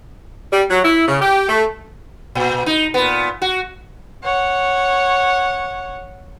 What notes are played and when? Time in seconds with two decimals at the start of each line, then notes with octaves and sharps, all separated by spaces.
0.53 G3
0.70 F#3
0.84 E4
1.08 C#3
1.21 G4
1.49 A3
2.35 A#2
2.66 D#4
2.94 A#2 B3
3.42 F#4
4.23 C#5 F#5